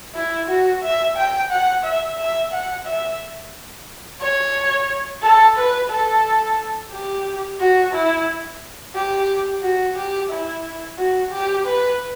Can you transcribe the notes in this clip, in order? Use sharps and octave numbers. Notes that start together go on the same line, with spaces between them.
E4
F#4
E5
G5
F#5
E5
E5
F#5
E5
C#5
A4
B4
A4
G4
F#4
E4
G4
F#4
G4
E4
F#4
G4
B4